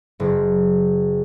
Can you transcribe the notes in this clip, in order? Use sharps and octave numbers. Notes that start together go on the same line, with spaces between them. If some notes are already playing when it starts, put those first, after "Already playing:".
F#1